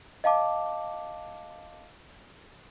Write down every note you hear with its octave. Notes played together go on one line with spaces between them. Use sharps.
D#5 F5 A5 D6